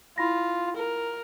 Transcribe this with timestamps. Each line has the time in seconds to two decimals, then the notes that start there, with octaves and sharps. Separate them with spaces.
0.18 E4 F4 B5 A#6
0.76 A#4